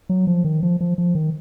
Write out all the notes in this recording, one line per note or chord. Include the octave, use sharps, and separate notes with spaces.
F#3
F3
D#3
F3
F3
F3
D#3